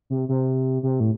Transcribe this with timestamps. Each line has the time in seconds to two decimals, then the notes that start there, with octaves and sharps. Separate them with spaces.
0.10 C3
0.29 C3
0.83 C3
1.00 A2